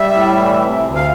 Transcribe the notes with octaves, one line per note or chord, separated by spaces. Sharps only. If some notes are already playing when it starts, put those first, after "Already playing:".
Already playing: G3 E5
A2
E3
C3
D2
F5